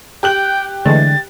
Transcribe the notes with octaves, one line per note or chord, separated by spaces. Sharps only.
G4 G5 F#6 F#7
D3 E3 G#3 A3 A6